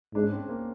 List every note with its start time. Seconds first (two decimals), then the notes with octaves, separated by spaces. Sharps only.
0.14 G#2 D4
0.23 C#4
0.32 C4
0.49 A#3